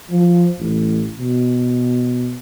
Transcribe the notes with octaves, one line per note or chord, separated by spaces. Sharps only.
F3
A1
B2